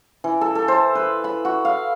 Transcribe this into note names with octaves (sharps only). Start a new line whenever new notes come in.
E3
A4
A4
C5
B4
B5
F#4
F5